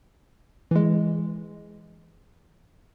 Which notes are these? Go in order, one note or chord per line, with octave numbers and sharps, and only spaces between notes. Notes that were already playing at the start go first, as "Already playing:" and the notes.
E3 G#3